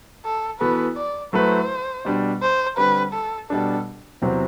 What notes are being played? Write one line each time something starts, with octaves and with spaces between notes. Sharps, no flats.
A4
E3 B3 F#4 A4 B4
D5
F#3 A3 E4 B4 C5
B2 G3 D4
C5
D3 G3 C4 B4
A4
B2 G3 D4 A4
E2 C3 F#3 C4